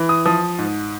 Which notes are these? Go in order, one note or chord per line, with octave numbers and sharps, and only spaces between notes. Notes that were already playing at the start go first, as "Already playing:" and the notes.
Already playing: E3
D#6
F3 D#6
G#2